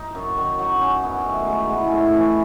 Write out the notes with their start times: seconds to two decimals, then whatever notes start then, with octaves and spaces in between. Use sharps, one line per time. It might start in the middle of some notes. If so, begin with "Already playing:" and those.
Already playing: D#4
0.15 F#2
0.37 D#3
0.59 F#3
0.80 F#2 C#4
1.03 F#2 B3
1.26 D#3 A3
1.47 F#3 G#3
1.69 E3 G#3
1.88 A2 G#3 A3
2.13 E3 C#4